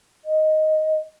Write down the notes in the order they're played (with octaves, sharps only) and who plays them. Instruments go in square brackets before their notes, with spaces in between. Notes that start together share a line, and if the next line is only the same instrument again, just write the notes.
[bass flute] D#5